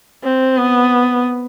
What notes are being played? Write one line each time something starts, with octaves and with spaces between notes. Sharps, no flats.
C4
B3